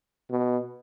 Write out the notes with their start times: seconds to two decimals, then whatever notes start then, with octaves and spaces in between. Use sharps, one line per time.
0.30 B2